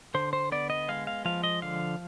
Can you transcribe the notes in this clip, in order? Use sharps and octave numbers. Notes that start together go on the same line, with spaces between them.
D3 C5
C5
B3 D5
D#5
G#3 F5
F5
F3 F5
D#5
D3 F5